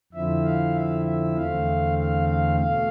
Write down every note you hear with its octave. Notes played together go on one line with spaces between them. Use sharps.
F2 D3 F3 C4 E4 E5
F5
E5
E5
E2 D3 A3 C4 F5
F5
F5
B2 A3 F5